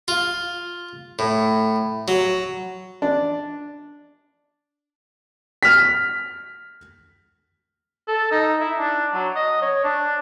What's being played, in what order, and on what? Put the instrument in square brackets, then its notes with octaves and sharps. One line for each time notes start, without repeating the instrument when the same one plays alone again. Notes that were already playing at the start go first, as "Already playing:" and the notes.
[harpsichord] F4
A2
F#3
[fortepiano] D4
[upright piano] F6 B6
[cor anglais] A4
D#4
E4
D4
F#3
D#5
C#5
D4